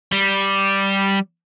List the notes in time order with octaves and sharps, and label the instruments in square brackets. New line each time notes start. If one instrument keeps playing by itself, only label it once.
[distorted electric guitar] G3